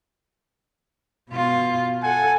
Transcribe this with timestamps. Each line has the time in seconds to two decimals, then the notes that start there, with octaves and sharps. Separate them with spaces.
1.30 B2 F4
2.03 A4 F#5 G#5